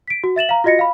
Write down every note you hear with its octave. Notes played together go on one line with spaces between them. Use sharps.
B6 D7
F#4
E5 A6 E7 F#7
F5 A#5
F4 F#4 D#5 A#6 C#7
F5 B5